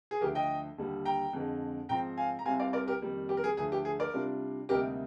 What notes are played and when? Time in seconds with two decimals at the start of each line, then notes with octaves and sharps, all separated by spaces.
0.11 G#4
0.21 D2 D3 F3 G4 A#4
0.35 D#5 G5
0.78 D#2 D3 G3
1.05 G5 A#5
1.33 F2 D3 G#3
1.89 G#2 F3 C4 G5 A#5
2.17 F5 G#5
2.39 A#5
2.45 C2 C3 G3 C4 F5 G#5
2.60 D5 F5
2.73 A#4 D5
2.87 G4 A#4
3.01 F2 D#3 G3 A#3
3.29 G4
3.37 A#4
3.44 G#4
3.57 D2 D3 F3 G#4
3.72 G4
3.85 G#4
4.00 A#4 D5
4.13 C3 G3 D4 F4
4.69 D2 C3 G3 A#3 D#4 G4 A#4